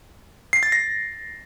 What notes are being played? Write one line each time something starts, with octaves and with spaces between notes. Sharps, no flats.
C7
A6
A#6